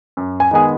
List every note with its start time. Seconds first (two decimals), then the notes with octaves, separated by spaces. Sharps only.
0.17 F#2
0.40 G#5
0.51 D#3 G#3 B3 G#4 G#5